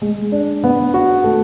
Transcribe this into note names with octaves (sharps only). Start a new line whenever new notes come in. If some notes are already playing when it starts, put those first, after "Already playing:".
G#3
D4
B3
F#4
A3